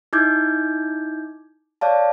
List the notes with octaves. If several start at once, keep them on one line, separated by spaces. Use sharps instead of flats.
D#4 E4 D6 G6 G#6
C#5 D5 F5 A5